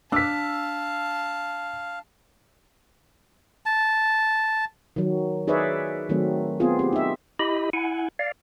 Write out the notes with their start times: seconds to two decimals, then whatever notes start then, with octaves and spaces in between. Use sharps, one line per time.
0.12 D4 F5 A5 E6 B6
3.66 A5
4.96 D#3 F#3
5.47 D#4 G#4 B4 C#5 D5 E5
6.09 D#3 F#3 A3 C4
6.60 B3 C4 F4 G#4
6.79 C4 G4
6.93 D#4 E5
7.39 E4 G4 D#5 B5
7.73 E4 F#5 G#5
8.19 D5 F5